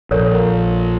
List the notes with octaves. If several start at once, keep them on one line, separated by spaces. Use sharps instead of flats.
A#1 A4 A#4 C#5